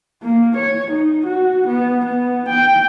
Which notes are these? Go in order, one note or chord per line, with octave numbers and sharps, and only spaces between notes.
A#3
C#5
D#4
F#4
B3
B3
G5